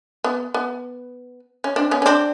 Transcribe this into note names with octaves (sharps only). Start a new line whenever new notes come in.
B3
B3
C#4
C4 D4
B3 C#4
C#4
C4 D4